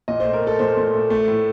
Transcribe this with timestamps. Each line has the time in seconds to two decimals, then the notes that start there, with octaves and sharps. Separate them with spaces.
0.08 A#2 D#5
0.20 A3 C5
0.33 A#4
0.42 A3
0.47 A4
0.59 A#2 C5
0.77 A#2
0.94 A3
1.10 A3
1.28 A2